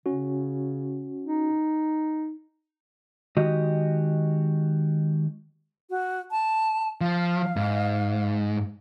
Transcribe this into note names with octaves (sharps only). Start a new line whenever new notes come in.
C#3 C#4 F#4
D#4
D#3 G#3 F#4 G4 D#5
F#4
A5
F3 F5
G#2